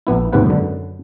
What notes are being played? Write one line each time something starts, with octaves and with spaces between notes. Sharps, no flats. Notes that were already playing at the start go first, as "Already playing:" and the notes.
A#1 B3 E4
D#2 G#2 C3 B4 F#5
F#2 D3